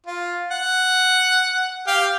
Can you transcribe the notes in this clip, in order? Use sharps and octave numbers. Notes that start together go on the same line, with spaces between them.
F4
F#5
G4 F5 G5